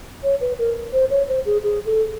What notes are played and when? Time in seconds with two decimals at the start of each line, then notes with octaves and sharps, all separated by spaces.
0.23 C#5
0.41 B4
0.59 A#4
0.93 C5
1.10 C#5
1.28 C5
1.46 G#4
1.63 G#4
1.86 A4